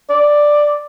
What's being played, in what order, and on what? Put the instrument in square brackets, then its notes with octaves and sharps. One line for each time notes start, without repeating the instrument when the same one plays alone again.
[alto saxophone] D5